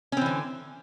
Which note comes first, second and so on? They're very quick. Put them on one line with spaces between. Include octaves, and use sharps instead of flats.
C#4 C4 E3 D3